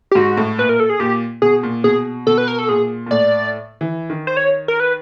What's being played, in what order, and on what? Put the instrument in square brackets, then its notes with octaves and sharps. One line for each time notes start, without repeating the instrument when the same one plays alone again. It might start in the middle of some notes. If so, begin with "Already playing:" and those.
[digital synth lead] G4
[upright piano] G#2 [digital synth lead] F#4
[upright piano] A2
[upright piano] A#2 [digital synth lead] B4
[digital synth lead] A#4
A4
G#4
[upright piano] A#2 [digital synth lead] G4
[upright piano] B2 [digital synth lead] G#4
[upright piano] A#2
[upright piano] B2 [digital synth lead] G#4
[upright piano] B2 [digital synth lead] A4
[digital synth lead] B4
A#4
A4
[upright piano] A#2 [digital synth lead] G#4
[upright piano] A#2
[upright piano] A2 [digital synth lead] D5
[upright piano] E3
D#3
[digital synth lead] C5
C#5
A#4
B4